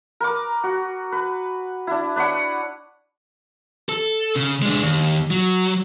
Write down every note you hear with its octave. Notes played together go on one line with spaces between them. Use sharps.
A#4 B4 D6
F#4
B4
D4 E4
D4 B4 C#5 F#5
A4
C#3
G#3 D4
D#2
F#3